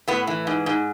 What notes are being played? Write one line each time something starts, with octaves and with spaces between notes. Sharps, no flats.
A2 B3
E3
G#2
G#2